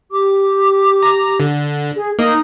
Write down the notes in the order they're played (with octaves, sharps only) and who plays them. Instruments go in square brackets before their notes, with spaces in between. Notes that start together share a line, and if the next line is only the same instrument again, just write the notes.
[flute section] G4 D6
[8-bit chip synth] A#5
D3
[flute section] G#4
[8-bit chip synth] A#3 D#5 [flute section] D#4 D#6